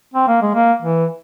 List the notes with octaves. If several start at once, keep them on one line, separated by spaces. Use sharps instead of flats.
C4
A#3
G#3
A#3
E3